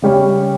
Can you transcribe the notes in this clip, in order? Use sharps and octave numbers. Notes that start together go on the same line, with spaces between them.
C#3 G3 C#4